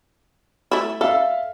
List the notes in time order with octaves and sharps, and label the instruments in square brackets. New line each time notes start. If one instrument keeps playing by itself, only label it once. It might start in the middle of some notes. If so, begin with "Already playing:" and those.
[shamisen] A3 E4
[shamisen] A4 [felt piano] E5 F5